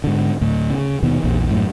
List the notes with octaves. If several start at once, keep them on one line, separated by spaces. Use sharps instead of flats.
G#2 D3
D2 A2
C#3
D#2 B2 D#3
A#1 E2 A#2
F#2 A2